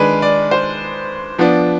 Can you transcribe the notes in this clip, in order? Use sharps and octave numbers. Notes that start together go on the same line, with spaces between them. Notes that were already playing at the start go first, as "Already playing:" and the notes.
Already playing: D#3 G#3 D4 B4
D5
C5
F3 B3 D4